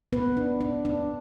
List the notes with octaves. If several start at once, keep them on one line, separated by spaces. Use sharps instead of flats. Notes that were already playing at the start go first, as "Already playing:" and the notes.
B3 B4
D4
D4
D4